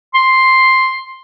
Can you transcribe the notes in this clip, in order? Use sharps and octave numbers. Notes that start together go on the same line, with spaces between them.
C6